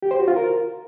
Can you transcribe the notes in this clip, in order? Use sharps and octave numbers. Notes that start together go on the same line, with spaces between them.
G4
C5
F#4
F4
A#4